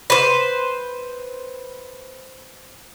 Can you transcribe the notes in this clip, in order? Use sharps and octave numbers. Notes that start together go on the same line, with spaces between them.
B4 C5